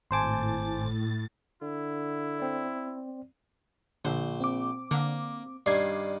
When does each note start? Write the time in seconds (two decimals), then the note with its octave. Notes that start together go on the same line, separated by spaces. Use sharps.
0.11 G#1 A2 C5 G#5 A5 C6 D6 A6
1.62 D3 E4
2.39 C4 D5
4.05 A#1 D3 C5
4.40 C4 D6
4.91 D3 A#3
5.66 G2 D#3 D5 G#6 C7